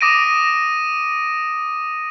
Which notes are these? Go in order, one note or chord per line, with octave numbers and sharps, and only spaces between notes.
D6 D#6 A#6 D7 D#7